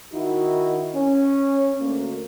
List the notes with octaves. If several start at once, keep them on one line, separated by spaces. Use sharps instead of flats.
D#3 D#4 E4 F#4
C#4
D2 A#3